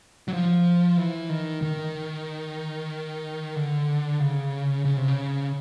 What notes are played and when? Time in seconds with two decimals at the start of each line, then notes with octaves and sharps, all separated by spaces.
0.28 F#3
0.33 F3
0.97 E3
1.29 D#3
1.62 D#3
3.56 D3
4.20 C#3
4.85 C#3
4.97 C3
5.08 C#3